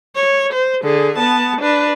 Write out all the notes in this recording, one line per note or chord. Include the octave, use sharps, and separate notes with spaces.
C#5
C5
D3 G#4
B3 A5
D4 B4